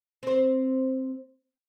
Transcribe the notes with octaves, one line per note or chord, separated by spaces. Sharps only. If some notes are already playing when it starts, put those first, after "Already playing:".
C4 C5